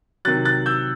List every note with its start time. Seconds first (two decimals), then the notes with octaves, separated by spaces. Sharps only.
0.25 C3 D#3 F#3 F#6 A6
0.45 F#6 A6
0.66 E6 G6